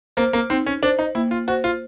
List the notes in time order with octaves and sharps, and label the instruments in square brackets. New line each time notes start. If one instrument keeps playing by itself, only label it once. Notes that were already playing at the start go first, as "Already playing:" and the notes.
[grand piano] A#3 [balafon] C5
[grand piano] A#3
[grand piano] C4 [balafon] D#4
[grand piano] C#4
[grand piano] D4 [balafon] C5
[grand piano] D#4
[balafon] A#3 [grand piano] E4
[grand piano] F4
[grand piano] F#4 [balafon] C5
[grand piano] F4